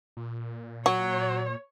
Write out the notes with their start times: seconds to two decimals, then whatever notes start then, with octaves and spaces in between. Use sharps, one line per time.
0.17 A#2
0.86 F#3 F#4 C#5